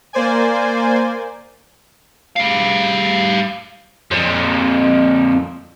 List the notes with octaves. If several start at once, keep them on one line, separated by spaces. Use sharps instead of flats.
A#3 C5 D5 G#5
G3 F5
F2 A#2